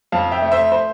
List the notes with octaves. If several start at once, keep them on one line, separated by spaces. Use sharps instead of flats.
F2 F5 A5
E5 G5
A3
C5 E5
C5